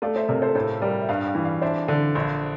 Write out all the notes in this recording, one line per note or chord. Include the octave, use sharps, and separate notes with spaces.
A3 D5 F5
C5 E5
C3 A#4 D5
A4 C5
A2 A4 C5
G3 A#4 D5
E5
G2 D5 F5
D5 F5
E3
D5 F5
D4 C5 E5
D3
A#1